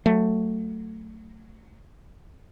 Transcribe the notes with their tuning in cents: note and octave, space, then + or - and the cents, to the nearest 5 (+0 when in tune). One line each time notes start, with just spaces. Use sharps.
F#3 +0 A3 +10